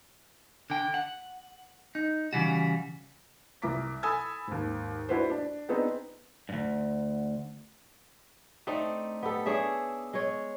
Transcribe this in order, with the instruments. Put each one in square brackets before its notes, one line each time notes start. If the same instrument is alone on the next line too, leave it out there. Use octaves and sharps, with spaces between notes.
[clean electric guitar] D3 G5
F#5
D#4
C#3 E3 G3 F#4
[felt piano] C2 A#5 D6 B6
A4 G#5 B5 D#6 E6 G#6
D#2 G#2
D4 E4 F#4 B4 C5
D4
B3 C4 D4 D#4 G#4 B4
[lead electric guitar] D2 G2
[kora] A3 C4 D4 D#4
B3 G4 A4
D4 G#4 C#5 E5
G#3 C#5